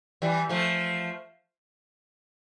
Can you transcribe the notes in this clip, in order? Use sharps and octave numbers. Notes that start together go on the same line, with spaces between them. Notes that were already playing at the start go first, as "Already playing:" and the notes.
E3 G3
F3 A3